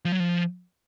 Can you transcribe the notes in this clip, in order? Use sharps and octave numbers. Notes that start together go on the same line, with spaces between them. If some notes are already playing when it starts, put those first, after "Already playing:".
F3
F#3
F3